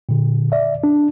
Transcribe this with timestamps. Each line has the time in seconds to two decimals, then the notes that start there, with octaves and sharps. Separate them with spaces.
0.09 A#2 D3
0.52 D5 E5
0.84 D4